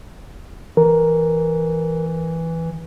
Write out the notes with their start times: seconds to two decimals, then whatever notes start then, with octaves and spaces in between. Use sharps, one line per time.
0.77 E3 A#4